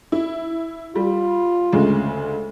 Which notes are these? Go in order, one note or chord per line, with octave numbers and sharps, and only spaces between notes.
E4
G3 F4
D2 C#3 G#3